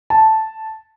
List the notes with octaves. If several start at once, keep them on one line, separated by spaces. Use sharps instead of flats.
A5